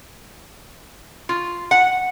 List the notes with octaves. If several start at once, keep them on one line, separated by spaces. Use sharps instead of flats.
F4
F#5